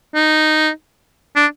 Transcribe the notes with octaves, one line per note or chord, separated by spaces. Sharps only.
D#4
D4